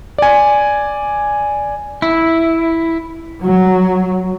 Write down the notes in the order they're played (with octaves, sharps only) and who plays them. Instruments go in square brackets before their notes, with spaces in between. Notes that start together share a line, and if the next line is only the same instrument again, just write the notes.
[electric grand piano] D5 G#5
[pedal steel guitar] E4
[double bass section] F#3